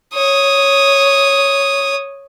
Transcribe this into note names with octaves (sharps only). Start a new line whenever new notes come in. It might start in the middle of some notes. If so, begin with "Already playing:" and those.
C#5 D#6